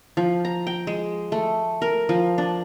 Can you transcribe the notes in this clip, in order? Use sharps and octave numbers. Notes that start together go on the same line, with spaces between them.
F3
A#5
G5
G#3
A3
A#4
F3
D4